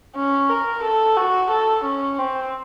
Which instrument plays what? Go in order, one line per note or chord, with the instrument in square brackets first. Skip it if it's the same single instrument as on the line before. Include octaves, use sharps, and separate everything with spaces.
[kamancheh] C#4
A#4
A4
F#4
A4
C#4
C4